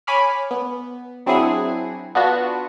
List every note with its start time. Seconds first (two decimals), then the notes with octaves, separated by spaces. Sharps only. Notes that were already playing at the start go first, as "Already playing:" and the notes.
0.07 C#5 G#5 B5 D6 F6
0.51 B3
1.26 F#3 C4 D4 E4 G#4 F#5
2.15 B3 D4 F4 F#4